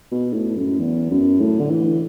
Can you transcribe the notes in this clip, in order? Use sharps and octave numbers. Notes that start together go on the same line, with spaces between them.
B2
A2
F#2
E2
F#2
A2
D3
E3